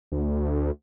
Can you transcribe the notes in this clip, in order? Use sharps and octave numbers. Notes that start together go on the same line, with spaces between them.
D2